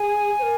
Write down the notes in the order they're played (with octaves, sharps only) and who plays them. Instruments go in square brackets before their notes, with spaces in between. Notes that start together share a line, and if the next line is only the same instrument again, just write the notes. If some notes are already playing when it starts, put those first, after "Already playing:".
Already playing: [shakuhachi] G#4 [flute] G#5
[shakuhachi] C5
A#4